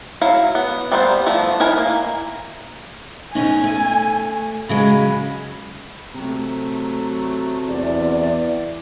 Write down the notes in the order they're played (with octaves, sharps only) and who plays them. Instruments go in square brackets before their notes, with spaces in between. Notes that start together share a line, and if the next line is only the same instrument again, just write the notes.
[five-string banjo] F#3 E4 F5
B3
G3 A#3 B3 E4 C5
F3 A3 B3
D#4 E4 A#4 G#5
A#3
[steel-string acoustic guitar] B2 C#4 D#4 [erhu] G#5
[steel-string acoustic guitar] A3
[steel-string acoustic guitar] C#3 F#3 G#3 [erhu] B5
[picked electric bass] C3 [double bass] F#3 A3 [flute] A#5
[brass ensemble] E2 [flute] D5